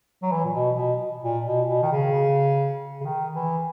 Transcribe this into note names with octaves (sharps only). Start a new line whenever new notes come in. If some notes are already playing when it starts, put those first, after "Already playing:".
F#3
E3
A#2
B2
B2
A#2
B2
B2
D#3
C#3
C#3
D#3
E3